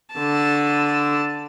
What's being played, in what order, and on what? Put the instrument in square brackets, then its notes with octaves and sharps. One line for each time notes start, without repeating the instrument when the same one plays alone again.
[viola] D3 A5